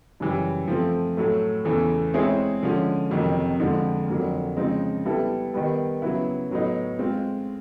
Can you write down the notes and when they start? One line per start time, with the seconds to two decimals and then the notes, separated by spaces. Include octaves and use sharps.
0.20 F#2 C#3 E3 G3
0.68 F3 A3 C4
1.17 A2 F#3 A3
1.65 E2 C#3 E3 A3
2.14 G#3 C4 E4 G#4 C#5
2.63 D3 F3 G#3 C#4
3.11 F2 C3 D#3 F#3 A#3
3.60 D3 F3 G#3 C4
4.08 F2 D3 F#3 A#3
4.57 C#3 F3 G#3 C4 D#4
5.05 G3 B3 E4 A4
5.54 D#3 G3 B3
6.02 C#3 F#3 B3 E4
6.51 A2 F#3 B3 D#4
6.99 G#3 C4 F4